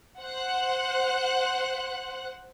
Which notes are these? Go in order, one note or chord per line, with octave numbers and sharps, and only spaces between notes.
C5 F#5 F#6